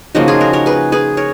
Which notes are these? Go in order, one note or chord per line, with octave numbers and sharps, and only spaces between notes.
C#3 F3 A#3 D#4 F#4
F4 G#4
F#4 A#4
A#4 C#5
G#4 B4
G#4 B4
A#4 C#5